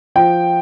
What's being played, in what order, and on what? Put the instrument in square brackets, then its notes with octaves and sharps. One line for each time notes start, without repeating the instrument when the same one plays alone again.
[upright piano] F3 G5